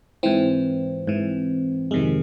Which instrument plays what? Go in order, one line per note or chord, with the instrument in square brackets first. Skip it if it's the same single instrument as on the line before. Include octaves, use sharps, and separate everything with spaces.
[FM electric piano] G#2 E3 C4
G#2 E3
F2 C3 D#3 G#3